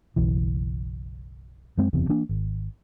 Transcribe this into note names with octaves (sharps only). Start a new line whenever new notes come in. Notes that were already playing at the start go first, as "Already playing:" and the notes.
F#1 B1 E3
F#2 G#3 C4
F#1 E2 C3
E3 A#3 D4
G#1